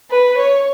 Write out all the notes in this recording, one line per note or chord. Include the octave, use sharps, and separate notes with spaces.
B4
C#5